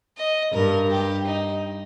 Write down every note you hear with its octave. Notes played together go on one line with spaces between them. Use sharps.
D#5
G2 A#4
G4
D#4